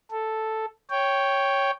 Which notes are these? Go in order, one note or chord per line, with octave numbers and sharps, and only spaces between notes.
A4
C#5 G5